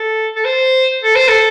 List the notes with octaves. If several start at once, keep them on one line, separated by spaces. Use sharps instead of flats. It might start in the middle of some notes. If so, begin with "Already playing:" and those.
Already playing: A4
A4
C5
A4
C5
A4